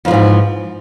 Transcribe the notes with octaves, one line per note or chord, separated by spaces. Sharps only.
F2 G#2 E3 F3